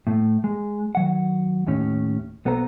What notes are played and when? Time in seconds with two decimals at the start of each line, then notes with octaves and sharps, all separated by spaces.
0.07 A2 A3
0.44 G#3
0.95 D#3 F#3 F#5
1.67 D#2 A2 C#4
2.45 B1 B3 A4 C5 A#5